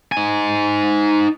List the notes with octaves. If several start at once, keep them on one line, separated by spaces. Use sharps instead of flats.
D#4 G#5